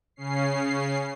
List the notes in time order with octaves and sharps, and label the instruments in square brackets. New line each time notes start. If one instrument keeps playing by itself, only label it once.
[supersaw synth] C#3 C#4 C7